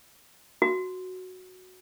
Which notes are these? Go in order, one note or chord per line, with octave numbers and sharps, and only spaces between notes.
F#4